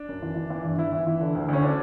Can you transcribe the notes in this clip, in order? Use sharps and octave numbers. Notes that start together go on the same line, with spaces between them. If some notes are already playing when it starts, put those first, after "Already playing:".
Already playing: D4
F#2
E3
E3
E3
G2
E3 E4
E3
E3
D3
D2
D2 C#4
D3 D4